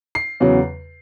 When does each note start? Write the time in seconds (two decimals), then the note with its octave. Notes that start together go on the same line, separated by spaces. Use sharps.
0.15 C7
0.40 E2 C#3 F#3